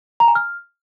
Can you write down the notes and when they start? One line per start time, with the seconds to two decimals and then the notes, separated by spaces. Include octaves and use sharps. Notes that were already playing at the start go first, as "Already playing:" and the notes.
0.20 A#5
0.28 G#5
0.35 F6